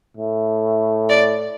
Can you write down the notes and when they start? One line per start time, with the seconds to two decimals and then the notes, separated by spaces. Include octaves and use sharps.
0.17 A2
1.09 D5